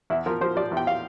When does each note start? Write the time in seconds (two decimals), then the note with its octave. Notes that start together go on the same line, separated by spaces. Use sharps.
0.10 E2 E4
0.26 F3 A#4
0.41 F3 C5
0.56 F3 D5
0.71 E2
0.77 G5
0.87 F5